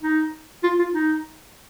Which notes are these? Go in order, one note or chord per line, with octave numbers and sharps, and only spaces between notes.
D#4
F4
F4
D#4